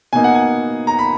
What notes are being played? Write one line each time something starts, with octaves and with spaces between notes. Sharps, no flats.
B2 A#3 D#4 G#5
F#5
G#5
A#5
B5